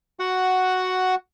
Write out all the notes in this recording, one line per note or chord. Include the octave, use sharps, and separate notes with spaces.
F#4 F#5